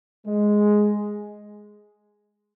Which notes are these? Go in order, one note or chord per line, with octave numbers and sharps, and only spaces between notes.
G#3